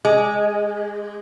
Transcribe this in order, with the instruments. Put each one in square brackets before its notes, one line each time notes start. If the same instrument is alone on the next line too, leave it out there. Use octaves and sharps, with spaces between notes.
[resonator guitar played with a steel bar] G#3